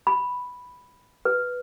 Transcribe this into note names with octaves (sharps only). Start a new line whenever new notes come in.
B5
B4